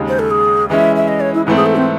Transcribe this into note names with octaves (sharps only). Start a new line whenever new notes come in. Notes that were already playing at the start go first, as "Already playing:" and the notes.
Already playing: D#2 C#3 G#3 D#4
C5
A4
G#4
E3 G#3 C#4 E4 E5
E5
D#5
C#5
E4
G#2 E3 A3 C4 E4
G#4
A4
C4